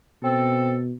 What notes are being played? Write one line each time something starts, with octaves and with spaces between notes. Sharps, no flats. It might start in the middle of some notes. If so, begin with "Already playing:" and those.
B2 C4 A4